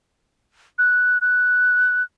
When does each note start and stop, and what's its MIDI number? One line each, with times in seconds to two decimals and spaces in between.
0.78 1.18 90
1.21 2.03 90